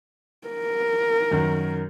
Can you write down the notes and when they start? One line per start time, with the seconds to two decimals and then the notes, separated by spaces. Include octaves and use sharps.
0.48 A#4
1.31 F#2 D#3 F#4